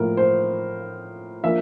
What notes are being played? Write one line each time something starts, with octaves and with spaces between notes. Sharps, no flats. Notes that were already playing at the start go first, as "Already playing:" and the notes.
Already playing: A2 F3 A#3 A#4
C5
F3 A#3 D4 E5